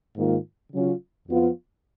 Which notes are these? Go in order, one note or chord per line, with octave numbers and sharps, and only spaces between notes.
G#2 D#3 A#3 F4
C#3 F#3 C#4 F4
F2 F3 B3 F4